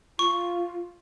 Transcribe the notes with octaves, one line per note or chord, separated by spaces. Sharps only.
F4 C#6